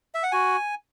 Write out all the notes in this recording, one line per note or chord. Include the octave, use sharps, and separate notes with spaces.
E5
F#5
F#4 G#5